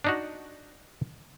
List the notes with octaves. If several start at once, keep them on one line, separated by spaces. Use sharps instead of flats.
D4 D#4 F#4